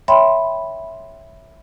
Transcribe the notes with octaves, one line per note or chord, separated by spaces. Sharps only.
C#5 E5 G5 B5 C6